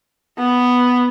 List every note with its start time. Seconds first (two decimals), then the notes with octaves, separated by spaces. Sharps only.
0.38 B3